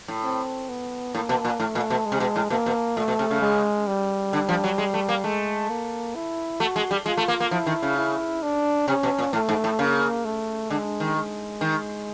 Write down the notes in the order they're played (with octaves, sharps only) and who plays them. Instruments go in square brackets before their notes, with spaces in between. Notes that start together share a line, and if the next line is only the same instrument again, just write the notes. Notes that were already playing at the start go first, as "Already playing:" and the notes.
[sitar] A2
[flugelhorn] C4
B3
[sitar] A2 [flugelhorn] A#3
[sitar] B2
A#2
[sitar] A2 [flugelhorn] A3
[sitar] A#2
B2
[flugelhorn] G#3
[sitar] C3
B2
A2
[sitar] B2 [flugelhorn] A#3
[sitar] B2
[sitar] A#2 [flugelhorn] A3
[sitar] B2
C3
C#3
[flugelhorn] G#3
G3
[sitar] D3
F3
F#3
G#3
A3
A#3
[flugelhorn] G#3 [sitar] A3
[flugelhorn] A#3
E4
[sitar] A3 [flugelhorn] F#4
[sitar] G#3
G3
[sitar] G#3 [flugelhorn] F4
[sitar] A3
A#3
A#3
[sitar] F3 [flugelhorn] E4
[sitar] D#3
C#3
[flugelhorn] E4
D4
[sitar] C3 [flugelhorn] C#4
[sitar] B2
A#2
[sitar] A2 [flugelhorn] A3
[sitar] G#2
A2
[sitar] C#3 [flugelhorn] A#3
[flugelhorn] A3
[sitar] D3 [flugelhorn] G#3
[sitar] D#3
[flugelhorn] G#3
[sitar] D#3